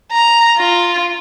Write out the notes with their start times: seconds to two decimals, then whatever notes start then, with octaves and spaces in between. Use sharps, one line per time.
0.12 A#5
0.57 F4